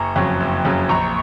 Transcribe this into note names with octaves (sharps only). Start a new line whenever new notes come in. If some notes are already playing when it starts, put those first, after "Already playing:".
Already playing: F#1 A#5 C#6
F2 C#3 F#3
F#1
F2 C#3 F#3
A#1 A#5 C#6